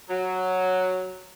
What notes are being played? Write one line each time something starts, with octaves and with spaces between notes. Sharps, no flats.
F#3